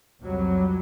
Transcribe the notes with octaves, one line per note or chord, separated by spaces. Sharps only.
C2 F2 F#3 G3